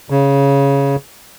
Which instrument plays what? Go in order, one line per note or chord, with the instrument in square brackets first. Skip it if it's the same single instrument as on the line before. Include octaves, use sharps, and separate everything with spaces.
[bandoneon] C#3